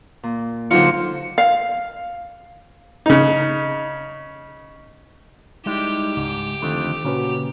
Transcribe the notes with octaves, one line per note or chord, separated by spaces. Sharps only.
A#2
D3 F#3 D#4 F4 C5 C#7
F5
C#3 D#4
G3 G#3 D#4 E4 G4
C#2 G#2
F2 D3 D#3 A3
A#2 C#3 C#4 F#4 B4